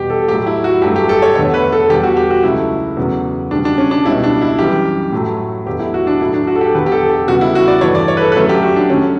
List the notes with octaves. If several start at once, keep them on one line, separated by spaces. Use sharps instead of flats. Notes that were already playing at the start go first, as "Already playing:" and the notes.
Already playing: E2 B2 G3 G4
A4
A2 F#3 A3 G4
E4
F#4
G2 F#3 A3 G4
G4
A4
C#5
E2 D3 A3 C#5
B4
A4
E2 D3 G3 G4
F#4
G4
F#4
C#2 C#3 F#3 A3 E4
E2 C#3 F#3 A3
D2 C#3 G3 D4
D4
C#4
D4
C#2 B2 G3 E4
D4
E4
F#2 E3 G3 G4
A2 F#3 A3
E2 D3 F#3 A3 G4
E4
F#4
D4
A2 F#3 A3 E4
D4
F#4
A4
G4
E2 D3 F#3 B4
G4
A4
G4
E2 C#3 G3 F#4
E4
F#4
D5
G2 E3 A3 C#5
D5
C#5
B4
A4
B4
F#2 D3 F#3 A3 A4
G4
F#4
D4
F#2 D3 A3 C#4